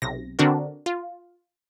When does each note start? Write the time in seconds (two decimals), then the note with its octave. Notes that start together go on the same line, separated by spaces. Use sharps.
0.02 B1 C3 A#6
0.39 D3 C4 D4 F#4 A#4
0.86 F4